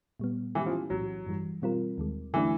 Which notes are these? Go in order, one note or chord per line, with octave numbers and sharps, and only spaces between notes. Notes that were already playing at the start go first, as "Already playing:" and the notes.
A#2 G3 B3
D#3 E3 G#3 C#4 E4 G4
F3
B1 A2 E3 F#3
G2 E3 G3
B2 G3 C4 F4 A#4
D#2 D#3 G#3
D3 E3 F#3 A3 D4